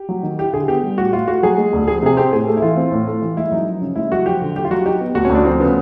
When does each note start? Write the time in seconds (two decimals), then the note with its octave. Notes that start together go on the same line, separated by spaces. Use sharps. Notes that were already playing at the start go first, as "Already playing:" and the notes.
Already playing: G4
0.09 F#3
0.23 D#3
0.38 E4 G4
0.53 D3 G#4
0.68 B3 G4
0.83 G3
0.98 A2 F#4
1.12 A2 F4
1.28 A3 F#4
1.43 F#3 G#4
1.58 G#3
1.73 D2
1.88 F3 G#4
2.02 C3 G#4
2.17 C4 G4
2.33 A2 G#4
2.47 A3
2.57 E4
2.62 E3 F4
2.77 C4
2.91 A2
3.07 A3
3.22 E3
3.37 G#3 E4
3.52 F#2 D#4
3.66 F3
3.82 C#3
3.96 G#3 E4
4.12 F#2 F#4
4.26 F3 G4
4.41 D3
4.56 F#3 G4
4.65 F4
4.71 F#3 F#4
4.86 D#4 G4
5.00 B3
5.15 D2 F#4
5.25 C#4
5.30 D2 D4
5.45 F3 C4
5.60 C#3 B3